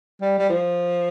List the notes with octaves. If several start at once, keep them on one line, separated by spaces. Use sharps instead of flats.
G3
G3
F3